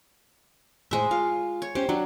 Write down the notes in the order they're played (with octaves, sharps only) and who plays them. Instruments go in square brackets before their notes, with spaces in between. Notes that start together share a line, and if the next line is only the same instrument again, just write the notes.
[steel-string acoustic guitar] A2 C5 [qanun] G#3 E5
[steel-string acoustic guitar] F4 [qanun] F5
[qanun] C#5
[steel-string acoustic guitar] C#4 C5 [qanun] G4
[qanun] F#3 [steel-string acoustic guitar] D4